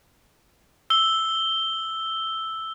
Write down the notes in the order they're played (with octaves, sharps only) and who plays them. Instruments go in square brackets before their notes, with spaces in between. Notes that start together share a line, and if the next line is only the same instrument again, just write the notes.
[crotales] E6 G7